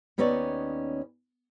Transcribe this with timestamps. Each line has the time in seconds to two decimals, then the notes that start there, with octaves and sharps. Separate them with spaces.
0.18 D#2 B3 C#4 D#4 C#5 D5